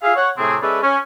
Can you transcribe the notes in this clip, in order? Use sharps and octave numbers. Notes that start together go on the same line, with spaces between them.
F4 G#4 E5 F5
C#5 F#5
A2 C3 A3 C4 G#4
G#3 C#4 A4 B4 D5 E5
C#4